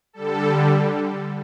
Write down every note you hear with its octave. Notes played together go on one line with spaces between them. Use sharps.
D3 G3 A4